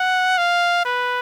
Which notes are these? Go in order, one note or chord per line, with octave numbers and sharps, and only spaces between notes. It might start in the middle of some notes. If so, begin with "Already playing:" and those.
Already playing: F#5
F5
B4